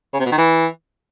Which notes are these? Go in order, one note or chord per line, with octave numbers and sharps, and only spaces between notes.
C#3
C3
B2
D#3
E3